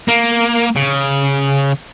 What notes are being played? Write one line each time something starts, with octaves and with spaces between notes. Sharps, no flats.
A#3
C#3